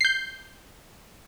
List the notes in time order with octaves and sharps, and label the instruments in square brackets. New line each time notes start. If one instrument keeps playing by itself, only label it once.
[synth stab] G6 C7